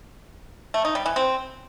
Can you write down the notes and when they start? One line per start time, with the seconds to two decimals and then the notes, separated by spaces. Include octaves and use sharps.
0.74 A3
0.85 D#4
0.95 G3
1.06 E3
1.16 C4